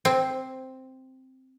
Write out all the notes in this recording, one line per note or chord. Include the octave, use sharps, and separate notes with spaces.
C4